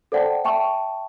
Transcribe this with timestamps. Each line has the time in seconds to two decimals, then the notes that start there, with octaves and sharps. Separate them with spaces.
0.12 A4 C5 D5 F#5 G5 A5
0.44 E5 G5 A5 C#6